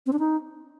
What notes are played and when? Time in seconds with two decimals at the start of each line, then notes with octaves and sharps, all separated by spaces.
0.06 C4
0.13 D4
0.19 D#4